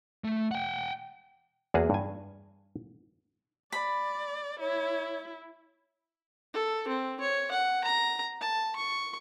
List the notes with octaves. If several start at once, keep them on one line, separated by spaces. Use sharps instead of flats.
A3
F#5 G5
E2 A#3 F#4 G#4 B4 A5
G2 G#5
D5 B5
E4 C#5
A4
C4
C#5
F#5
A#5
A5
C#6